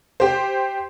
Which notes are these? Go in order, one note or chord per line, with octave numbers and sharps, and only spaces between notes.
G4 C5